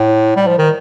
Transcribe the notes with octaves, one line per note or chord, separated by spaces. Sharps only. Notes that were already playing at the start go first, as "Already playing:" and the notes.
Already playing: A2
G3
F3
D#3